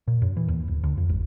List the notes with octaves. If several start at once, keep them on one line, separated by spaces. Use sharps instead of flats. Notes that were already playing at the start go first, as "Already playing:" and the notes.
A#2
F#2
E3
D#2
D1
D2
F2
G#1